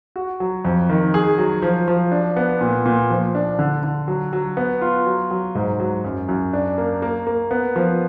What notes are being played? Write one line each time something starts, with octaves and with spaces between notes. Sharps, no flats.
F#4
F#3
F2
D#3
G#4
F#3
F3
F3
D4
B3
A#2
A#2
F3
D4
D3
D3
F#3
F#3
B3
F4
F#3
F#3
G#2
F#3
F#2
F#2
D4
A#3
A#3
A#3
B3
F3